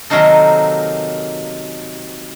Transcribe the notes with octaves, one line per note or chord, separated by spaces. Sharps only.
C3 D#3 F#3 A#3 D#4 A4